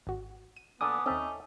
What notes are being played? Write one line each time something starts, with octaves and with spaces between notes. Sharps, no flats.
G#1 F#4
D#7
A#1 B3 D4 A4 G#5 D6 D#6
D#2 C4 C#4 D#4 A4 E5